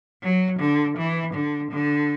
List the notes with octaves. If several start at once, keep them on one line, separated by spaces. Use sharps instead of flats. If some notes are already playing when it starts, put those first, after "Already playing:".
F#3
D3
E3
D3
D3